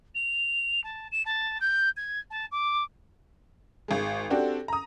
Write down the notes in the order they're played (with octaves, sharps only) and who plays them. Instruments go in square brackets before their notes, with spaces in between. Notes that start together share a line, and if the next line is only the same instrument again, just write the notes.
[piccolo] F7
A5
E7
A5
G6
G#6
A5
D6
[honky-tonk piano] G#1 G#3
C4 D4 F#4 G4 A4
A#5 D#6